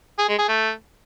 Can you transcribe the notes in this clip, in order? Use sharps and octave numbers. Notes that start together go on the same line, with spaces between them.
G#4
G#3
G#4
A3